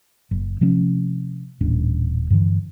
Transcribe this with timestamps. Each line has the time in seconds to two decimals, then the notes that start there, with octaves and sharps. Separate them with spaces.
0.31 F#1
0.61 C3 F3 A3 C#4
1.61 D#1 A1 D4
2.30 G2 D3 E3